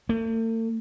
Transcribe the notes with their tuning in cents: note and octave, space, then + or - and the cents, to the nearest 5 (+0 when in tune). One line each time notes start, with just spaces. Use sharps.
A3 +45